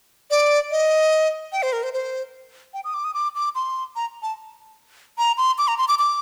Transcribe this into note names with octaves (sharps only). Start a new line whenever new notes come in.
D5
D#5
G5
C5
A#4
C5
C5
G5
D#6
D6
D#6
D6
D6
C6
A#5
A5
A#5
C6
D6
A#5
C6
D6
D6